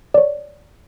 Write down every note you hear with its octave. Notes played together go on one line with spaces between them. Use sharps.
C#5 D5